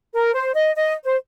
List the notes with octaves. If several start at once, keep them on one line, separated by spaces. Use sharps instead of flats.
A#4
C5
D#5
D#5
C5